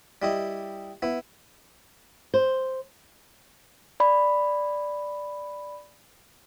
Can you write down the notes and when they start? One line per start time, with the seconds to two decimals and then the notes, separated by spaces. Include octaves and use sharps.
0.22 G3 E4 D#5
1.02 B3 E4
2.34 C5
4.00 D5 B5